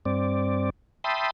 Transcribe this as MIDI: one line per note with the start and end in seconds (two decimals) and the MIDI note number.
0.05 0.70 43
0.05 0.70 60
0.05 0.70 74
1.04 1.30 76
1.04 1.30 79
1.04 1.30 81
1.04 1.30 83
1.04 1.30 84
1.04 1.30 87